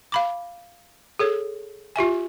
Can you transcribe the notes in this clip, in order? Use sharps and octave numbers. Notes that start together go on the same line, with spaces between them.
F5 B5 D6
G#4 A4 C#5
F4 G4 E5 G#5